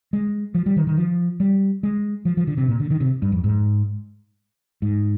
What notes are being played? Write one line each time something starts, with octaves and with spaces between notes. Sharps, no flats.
G#3
F3
G3
D#3
D#3
F3
G3
G#3
F3
F3
D3
C3
A#2
D3
D#3
C3
G2
F2
G#2
G#2